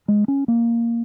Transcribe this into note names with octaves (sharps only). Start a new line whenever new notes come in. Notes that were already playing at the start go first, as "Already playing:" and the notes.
G#3
C#4
A#3